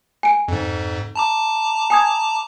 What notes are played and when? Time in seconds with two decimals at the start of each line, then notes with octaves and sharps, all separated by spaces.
0.23 G#5 D7
0.48 F2 G#2
1.16 A5 A#5 D6
1.90 G#5 D#6 G#6